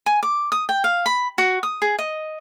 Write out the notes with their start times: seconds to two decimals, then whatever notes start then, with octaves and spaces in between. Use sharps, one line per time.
0.06 G#5
0.23 D6
0.52 D#6
0.69 G5
0.84 F5
1.06 B5
1.38 F#4
1.63 D#6
1.82 G#4
1.99 D#5